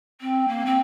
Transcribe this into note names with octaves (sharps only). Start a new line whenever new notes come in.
C4
A#3
C4